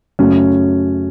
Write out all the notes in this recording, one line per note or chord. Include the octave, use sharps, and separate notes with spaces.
F#2 C#3 F#3 A3 C#4